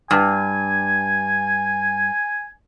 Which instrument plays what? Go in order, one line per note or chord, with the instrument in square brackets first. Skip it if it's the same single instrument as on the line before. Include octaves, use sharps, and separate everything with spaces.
[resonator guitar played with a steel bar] G2 [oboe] G#5